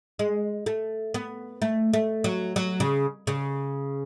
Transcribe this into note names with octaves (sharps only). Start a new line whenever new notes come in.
G#3
A3
B3
A3
A3
F#3
F#3
C#3
C#3